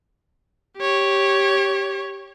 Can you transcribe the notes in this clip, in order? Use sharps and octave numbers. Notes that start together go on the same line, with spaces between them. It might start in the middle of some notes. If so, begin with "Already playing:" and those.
G4 C#5